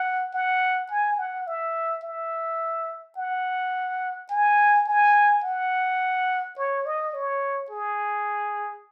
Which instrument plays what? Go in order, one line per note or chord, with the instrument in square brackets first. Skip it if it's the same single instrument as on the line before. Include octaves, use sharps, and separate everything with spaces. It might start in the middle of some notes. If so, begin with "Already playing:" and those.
Already playing: [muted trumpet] F#5
F#5
G#5
F#5
E5
E5
F#5
G#5
G#5
F#5
C#5
D#5
C#5
G#4